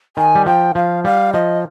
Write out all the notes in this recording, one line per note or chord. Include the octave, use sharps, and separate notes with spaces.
D#3 G#5
G3
F3 G5
F3 F5
G3 F5
F3 D#5